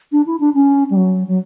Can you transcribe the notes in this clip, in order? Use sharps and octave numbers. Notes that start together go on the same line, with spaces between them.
D4
E4
D4
C#4
G3
F#3
F#3